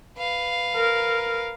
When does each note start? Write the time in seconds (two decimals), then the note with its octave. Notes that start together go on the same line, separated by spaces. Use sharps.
0.18 B4 F5
0.75 A#4